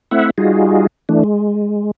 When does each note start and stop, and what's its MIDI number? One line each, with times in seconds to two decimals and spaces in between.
0.11 0.30 57
0.11 0.30 60
0.11 0.30 64
0.11 0.30 76
0.11 0.30 78
0.38 0.87 55
0.38 0.87 63
0.38 0.87 65
0.38 0.87 66
0.38 0.87 68
1.09 1.23 52
1.09 1.23 57
1.09 1.23 62
1.24 1.91 56